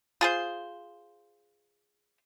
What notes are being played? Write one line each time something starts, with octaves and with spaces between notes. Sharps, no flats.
F4 G#4 C5